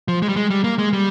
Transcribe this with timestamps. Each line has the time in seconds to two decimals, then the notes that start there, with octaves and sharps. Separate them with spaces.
0.08 F3
0.22 G#3
0.29 G3
0.36 G#3
0.50 G3
0.64 A#3
0.78 G#3
0.93 G3